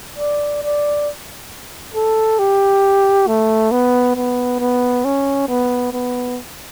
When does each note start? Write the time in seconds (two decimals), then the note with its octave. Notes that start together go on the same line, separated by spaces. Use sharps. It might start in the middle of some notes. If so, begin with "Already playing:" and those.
0.18 D5
0.63 D5
1.95 A4
2.39 G4
3.27 A3
3.71 B3
4.16 B3
4.60 B3
5.05 C#4
5.48 B3
5.93 B3